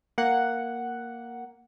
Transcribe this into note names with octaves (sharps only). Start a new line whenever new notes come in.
A#3 F#5